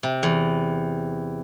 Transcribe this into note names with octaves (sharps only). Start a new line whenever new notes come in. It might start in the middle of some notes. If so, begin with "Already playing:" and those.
C3
E2